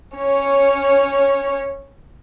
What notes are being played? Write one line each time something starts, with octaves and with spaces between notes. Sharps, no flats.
C#4 C#5